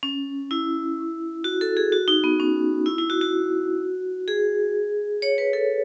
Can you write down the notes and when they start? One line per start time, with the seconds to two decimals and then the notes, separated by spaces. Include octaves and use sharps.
0.03 C#4
0.51 E4
1.44 F#4
1.61 A4
1.77 G#4
1.92 F#4
2.08 D#4
2.24 B3
2.40 C#4
2.86 E4
2.98 E4
3.10 F#4
3.21 F#4
4.28 G#4
5.22 C#5
5.38 B4
5.53 A4